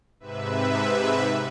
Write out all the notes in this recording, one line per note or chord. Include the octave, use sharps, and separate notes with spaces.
G#2 C3 B4 E5